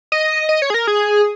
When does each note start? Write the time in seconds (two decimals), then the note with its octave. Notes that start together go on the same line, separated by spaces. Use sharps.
0.12 D#5
0.49 D#5
0.62 C#5
0.70 G#4
0.74 A#4
0.87 G#4